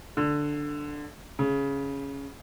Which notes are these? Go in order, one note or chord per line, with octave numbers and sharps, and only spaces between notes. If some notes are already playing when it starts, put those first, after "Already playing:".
D3
C#3